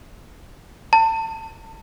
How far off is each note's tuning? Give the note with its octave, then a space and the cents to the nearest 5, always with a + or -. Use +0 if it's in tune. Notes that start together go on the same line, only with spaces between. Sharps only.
A5 +30